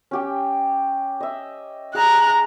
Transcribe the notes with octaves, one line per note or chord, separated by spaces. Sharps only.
C#4 G4 G5
D#5 E5
G#4 A#5 F#6